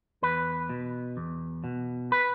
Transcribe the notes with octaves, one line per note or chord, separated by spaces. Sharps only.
E2 B4
B2
E2
B2
B4